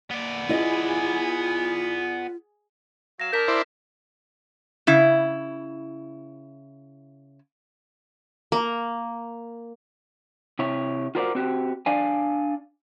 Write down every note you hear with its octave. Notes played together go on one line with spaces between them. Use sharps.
A#3 B3 D5
E4 F4 G#4 D#5 G#5
F#3 F5 A#6 E7
D4 G#4 A#4 G6 B6
E4 C5 D5
C#3 E4
A#3
C3 E4 C#5
F4 F#4 A#4 C5 D5
C4 F#4 G4
D4 D5 F5 G#5